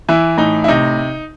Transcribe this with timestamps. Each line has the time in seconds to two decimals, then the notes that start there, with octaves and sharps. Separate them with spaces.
0.09 E3 E4
0.38 A2 D#4
0.64 E4
0.68 C3 D#4